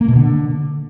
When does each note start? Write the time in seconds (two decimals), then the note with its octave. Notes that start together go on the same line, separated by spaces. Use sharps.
0.01 A#3
0.08 B2
0.16 D3